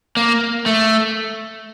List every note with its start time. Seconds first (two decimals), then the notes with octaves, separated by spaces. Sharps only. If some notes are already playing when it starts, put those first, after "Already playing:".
0.17 A#3
0.66 A3